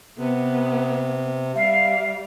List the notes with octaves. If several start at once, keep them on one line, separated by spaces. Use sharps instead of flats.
C3 B3
G3 E5 F5